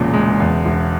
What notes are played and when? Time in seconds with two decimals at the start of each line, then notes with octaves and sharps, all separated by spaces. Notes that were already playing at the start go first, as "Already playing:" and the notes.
Already playing: E1 E2 A#2 C#3
0.13 G#3
0.40 E2
0.65 E1